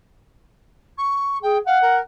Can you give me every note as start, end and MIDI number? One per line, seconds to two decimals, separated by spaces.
0.98 1.38 85
1.42 1.59 68
1.42 1.58 79
1.66 1.79 77
1.66 1.97 78
1.82 2.01 70